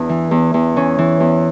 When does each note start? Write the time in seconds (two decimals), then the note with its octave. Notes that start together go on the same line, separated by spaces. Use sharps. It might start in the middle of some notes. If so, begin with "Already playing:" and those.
Already playing: E2 D4
0.09 E3
0.31 E2
0.54 E2
0.76 E3 C#4
0.98 E3
1.20 E2